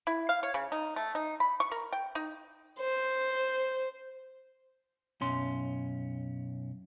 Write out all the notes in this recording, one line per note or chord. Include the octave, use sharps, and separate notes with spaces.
E4
F5
C#5
C#3
D#4
A3
D#4
B5
C#6
A#4
G5
D#4
C5
B1 F#2 C#4 C6